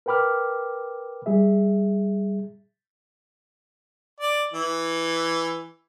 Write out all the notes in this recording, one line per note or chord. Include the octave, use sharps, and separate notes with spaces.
A#4 B4 G5 B5 D6 F6
G3 G#4 E5
D5
E3